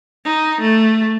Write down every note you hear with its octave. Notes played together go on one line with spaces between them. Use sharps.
D#4
A3